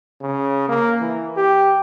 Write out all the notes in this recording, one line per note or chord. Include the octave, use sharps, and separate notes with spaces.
C#3
A#3
E3
G4